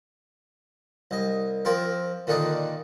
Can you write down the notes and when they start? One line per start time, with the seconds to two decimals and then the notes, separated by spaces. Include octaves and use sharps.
1.11 C2 D#5
1.65 F3 C4 F4 A#4
2.27 A#2 D3 D#3 D4 D#4